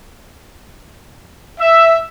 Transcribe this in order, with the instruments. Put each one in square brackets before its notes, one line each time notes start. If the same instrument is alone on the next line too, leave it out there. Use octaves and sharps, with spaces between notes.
[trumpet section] E5